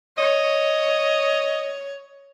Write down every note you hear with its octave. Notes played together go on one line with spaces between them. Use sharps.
C#5 D#5